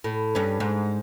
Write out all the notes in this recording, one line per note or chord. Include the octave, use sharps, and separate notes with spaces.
A2
G2 C#4
G#2